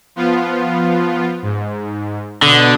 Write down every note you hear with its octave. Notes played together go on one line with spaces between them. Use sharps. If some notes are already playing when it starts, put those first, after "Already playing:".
F3 B3 F4
G#2
B2 D3 B3 D#6